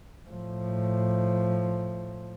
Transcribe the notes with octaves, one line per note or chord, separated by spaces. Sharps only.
A2 F3